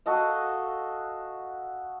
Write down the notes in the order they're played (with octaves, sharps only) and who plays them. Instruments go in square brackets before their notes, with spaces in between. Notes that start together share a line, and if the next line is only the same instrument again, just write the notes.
[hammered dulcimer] F#4 A4 D#5 F5